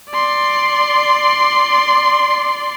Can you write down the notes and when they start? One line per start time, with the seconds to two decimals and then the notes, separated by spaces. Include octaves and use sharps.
0.12 D5 C6